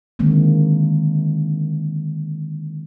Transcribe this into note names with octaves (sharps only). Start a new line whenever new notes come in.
D3 D#3 G#3 A#3 C4